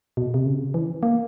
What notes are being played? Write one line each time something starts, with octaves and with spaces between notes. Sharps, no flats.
B2
C3
C#3
E3
A#3